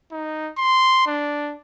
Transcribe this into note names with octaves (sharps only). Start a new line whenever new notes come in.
D#4
C6
D4